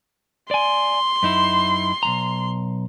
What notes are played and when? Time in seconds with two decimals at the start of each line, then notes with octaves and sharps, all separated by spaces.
0.51 D5 G#5 C6
1.23 F#2 D#4 E4
2.03 B1 E2 A#5